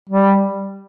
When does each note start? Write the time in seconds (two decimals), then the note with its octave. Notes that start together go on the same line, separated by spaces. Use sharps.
0.09 G3